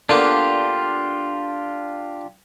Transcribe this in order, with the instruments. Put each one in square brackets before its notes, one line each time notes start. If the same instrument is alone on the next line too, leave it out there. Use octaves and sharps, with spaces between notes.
[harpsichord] D3 A#3 B3 [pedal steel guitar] D4 F4 G4